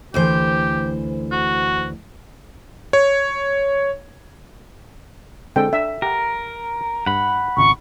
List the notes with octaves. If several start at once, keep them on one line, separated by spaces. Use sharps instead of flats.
D2 E3 G4 C5
F#4
C#5
D3 G#3 C4 A4 G5
D4 E5
G4 A#4 F#5
G2 F#5 B5
G#1 C#2 C#6